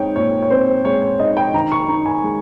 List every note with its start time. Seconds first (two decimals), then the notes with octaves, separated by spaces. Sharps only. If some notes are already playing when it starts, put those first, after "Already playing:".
Already playing: G#3 C4 D#4 C#5 G5
0.16 A#2 C#5
0.43 C#5
0.50 C4 C5
0.85 G#3 C#5
1.02 C#5
1.19 D#4 D#5
1.37 G5
1.54 D#3 A#5
1.72 C#6
1.89 D#4 A#5
2.06 G#5
2.24 G#3